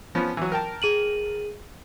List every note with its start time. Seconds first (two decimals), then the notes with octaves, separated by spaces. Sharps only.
0.15 F3 B3 C#4
0.37 E3 F#3
0.52 A#4 G5 A5
0.82 G#4 D#7 F#7